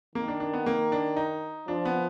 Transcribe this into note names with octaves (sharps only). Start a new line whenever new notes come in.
D#3 A#3
D4
D4
B3
A#3
D4
D#4
F3 D4
B3